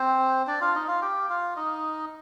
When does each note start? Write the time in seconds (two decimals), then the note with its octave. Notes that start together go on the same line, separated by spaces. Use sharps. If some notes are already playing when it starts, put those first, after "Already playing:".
Already playing: C4 C5
0.47 D4 D5
0.61 F4 F5
0.75 D#4 D#5
0.88 F4 F5
1.02 G4 G5
1.29 F4 F5
1.56 D#4 D#5